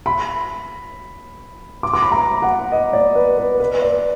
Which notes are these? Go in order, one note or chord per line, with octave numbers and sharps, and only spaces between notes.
B5
D6
D6
B5
A#5
F#5
D#5
D5
B4
B4
B4
D5